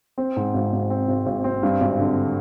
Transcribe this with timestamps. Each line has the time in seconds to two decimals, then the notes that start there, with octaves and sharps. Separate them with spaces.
0.18 C4
0.36 G#2
0.54 G#1
0.73 G#1
0.90 C4
1.09 G#1
1.26 G#1
1.44 C4
1.63 G2
1.81 G#1
1.99 D3